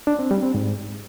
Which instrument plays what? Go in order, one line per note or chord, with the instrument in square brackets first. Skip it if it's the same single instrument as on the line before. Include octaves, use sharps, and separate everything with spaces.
[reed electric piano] D4
C4
G3
C4
G#2